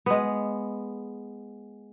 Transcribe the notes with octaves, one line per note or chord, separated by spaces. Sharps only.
G#3 B3